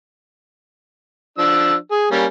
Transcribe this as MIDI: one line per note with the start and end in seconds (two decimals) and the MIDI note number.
1.38 1.75 53
1.38 1.75 62
1.38 1.75 88
1.91 2.09 68
2.11 2.25 55
2.11 2.25 58
2.11 2.25 61